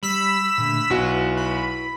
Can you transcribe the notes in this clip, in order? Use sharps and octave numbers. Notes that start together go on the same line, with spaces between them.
G3 B5 E6 B6
A#2 D3 A3
B1 E4 F#4 B4
B5